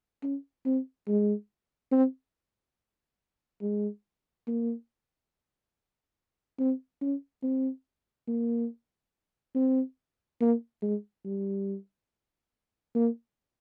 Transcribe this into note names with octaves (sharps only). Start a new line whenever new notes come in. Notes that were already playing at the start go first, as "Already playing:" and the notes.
C#4
C4
G#3
C4
G#3
A#3
C4
C#4
C4
A#3
C4
A#3
G#3
G3
A#3